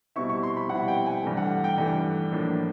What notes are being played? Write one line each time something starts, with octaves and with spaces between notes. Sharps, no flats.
B2 G3 C4 E4 C#6
C#6
C6
B5
B2 G3 C4 E4 F#5
G5
G#5
G2 E3 A3
F#5
G5
G2 E3 A3
A2 F3 A#3 D4